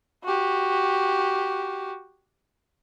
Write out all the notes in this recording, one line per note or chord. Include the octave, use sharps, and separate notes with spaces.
F#4 G4